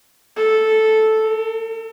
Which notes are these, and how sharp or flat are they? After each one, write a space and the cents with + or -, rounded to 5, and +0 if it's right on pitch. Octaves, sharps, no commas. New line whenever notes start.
A4 -5
A4 +45